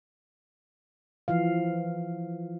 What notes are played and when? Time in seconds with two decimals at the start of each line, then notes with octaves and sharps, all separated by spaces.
1.28 E3 F3 F5